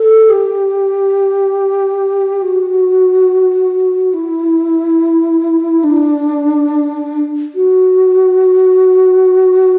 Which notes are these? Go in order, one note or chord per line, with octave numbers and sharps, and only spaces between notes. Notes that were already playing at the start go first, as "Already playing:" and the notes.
Already playing: A4
G4
F#4
E4
D4
F#4